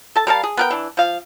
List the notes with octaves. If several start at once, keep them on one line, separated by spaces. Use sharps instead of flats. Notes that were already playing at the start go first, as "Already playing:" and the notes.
A4 A5
G3 A#4 F5 A5
G#4
B3 A#4 G5
E3 D4
F3 F5